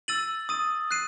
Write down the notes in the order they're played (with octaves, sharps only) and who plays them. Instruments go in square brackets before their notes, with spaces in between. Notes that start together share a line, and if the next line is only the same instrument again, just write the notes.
[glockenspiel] E6 A6 D#7 F#7
D#6 A6 D#7
F#6 C7 D#7